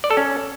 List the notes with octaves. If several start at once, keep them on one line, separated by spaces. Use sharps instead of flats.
D5
A4
C#4